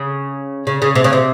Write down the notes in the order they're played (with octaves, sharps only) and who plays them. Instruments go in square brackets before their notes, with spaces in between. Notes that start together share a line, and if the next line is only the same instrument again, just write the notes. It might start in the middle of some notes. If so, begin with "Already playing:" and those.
Already playing: [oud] C#3
C#3
C#3
C3
C#3
C3